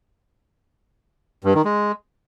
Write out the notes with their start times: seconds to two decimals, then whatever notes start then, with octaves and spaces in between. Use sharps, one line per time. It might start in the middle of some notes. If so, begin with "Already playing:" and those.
1.44 G2
1.55 D#3
1.65 G#3